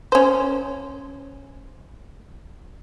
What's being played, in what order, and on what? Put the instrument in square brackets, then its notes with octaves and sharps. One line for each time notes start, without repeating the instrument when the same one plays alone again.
[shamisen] C#4 C5